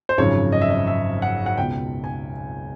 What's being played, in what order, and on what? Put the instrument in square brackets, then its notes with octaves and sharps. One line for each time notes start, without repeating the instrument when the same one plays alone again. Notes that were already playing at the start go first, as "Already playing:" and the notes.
[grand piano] C5
G#1 F#2 C#3 F3 C#5
D#5
E5
D#5
E5
F#5
F#5
C#2 B2 G5
G#5